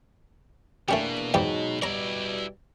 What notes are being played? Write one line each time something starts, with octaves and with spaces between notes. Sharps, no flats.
E2 B2 A3 A#3 C#4 D4 G4
E2 G#2 F#3 G#3 D#4 G4
B2 G3 E4 C#5 D5 A#5